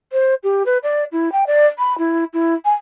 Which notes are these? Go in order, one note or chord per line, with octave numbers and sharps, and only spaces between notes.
C5
G4
B4
D5
E4
G5
D5
B5
E4
E4
G#5